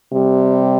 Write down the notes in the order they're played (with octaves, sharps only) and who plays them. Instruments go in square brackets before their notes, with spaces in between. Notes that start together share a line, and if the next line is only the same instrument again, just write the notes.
[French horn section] C3 G3